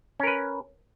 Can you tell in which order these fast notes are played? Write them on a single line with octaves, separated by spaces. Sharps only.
C#4 A#4 B4